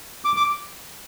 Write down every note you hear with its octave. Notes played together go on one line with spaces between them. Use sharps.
D6
D6